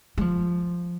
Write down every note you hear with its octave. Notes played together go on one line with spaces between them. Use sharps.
G#3
F3